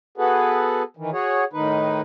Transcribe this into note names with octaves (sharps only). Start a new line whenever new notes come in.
B3 F#4 G#4 A4 B4
D#3 E3
F#4 G#4 C#5
A2 D#3 D#4 B4